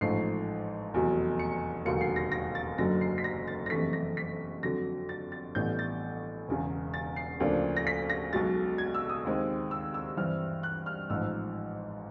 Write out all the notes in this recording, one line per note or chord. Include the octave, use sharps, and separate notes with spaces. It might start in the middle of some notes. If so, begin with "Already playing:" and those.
A1 G#2 F3 A3 C7
F1 E2 B2 F#3
C#7
E1 D#2 D3 F#3 A#3 C#7
C7
A#6
A#6
A6
F#1 F#2 D3 F#3 A#6
C7
B6
A#6
A6
A#6
F#1 F2 C3 E3 A3 B6
A#6
B6
F2 D3 F#3 A#6
A6
A6
A1 A2 E3 G3 B3 G6
A6
E1 E2 C#3
A6
C7
D2 C#3 F3 A#3 D4
A#6
B6
A#6
B1 B2 G#3 A6
G#6
E6
D#6
D#2 D#3 G#3 C4
E6
E6
G2 E3 G3 C4 F6
F#6
F6
A1 G#2 F3 E6